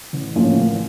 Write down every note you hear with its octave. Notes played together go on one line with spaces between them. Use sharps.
A1
A2 F3 A#3 C#4
A1